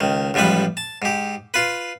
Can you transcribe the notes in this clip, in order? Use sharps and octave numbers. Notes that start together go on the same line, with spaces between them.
C#2 D#3
A1 G#2 F3 G3 B4
A5
G#2 G4
F4 B4